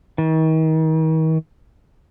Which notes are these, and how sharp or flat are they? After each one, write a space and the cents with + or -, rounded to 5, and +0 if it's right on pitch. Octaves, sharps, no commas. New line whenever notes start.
D#3 +40